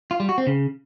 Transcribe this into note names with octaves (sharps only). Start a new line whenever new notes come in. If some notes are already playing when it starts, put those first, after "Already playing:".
F4
G3
F#4
C4
C#3